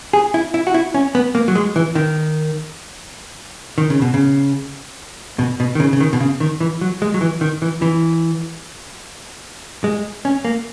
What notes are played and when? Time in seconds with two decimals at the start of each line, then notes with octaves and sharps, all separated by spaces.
0.13 G#4
0.34 E4
0.54 E4
0.67 F#4
0.74 E4
0.94 C#4
1.15 B3
1.35 A#3
1.48 F#3
1.55 G#3
1.76 E3
1.95 D#3
3.78 D#3
3.90 C#3
4.02 B2
4.14 C#3
5.39 B2
5.60 B2
5.75 D#3
5.80 C#3
5.93 C#3
6.00 D#3
6.13 B2
6.20 C#3
6.40 D#3
6.60 E3
6.81 F#3
7.02 G#3
7.14 F#3
7.21 E3
7.41 D#3
7.62 E3
7.82 E3
9.84 G#3
10.25 C#4
10.45 A#3